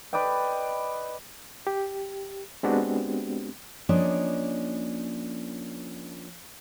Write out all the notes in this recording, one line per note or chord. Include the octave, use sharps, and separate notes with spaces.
B4 D5 D#5 G5
G4
G#3 B3 C4 D4 F#4 G4
F3 A#3 C#4 D4 D#5